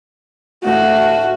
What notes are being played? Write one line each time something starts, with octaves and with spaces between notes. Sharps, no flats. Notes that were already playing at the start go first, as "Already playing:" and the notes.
D2 A2 F#4 F5